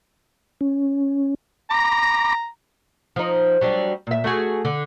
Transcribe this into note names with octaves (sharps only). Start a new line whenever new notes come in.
C#4
A#5 B5 D6 A#6
F3 D#4
F#3 G3 D4
A#2 E5
A3 F#4 G#4
D3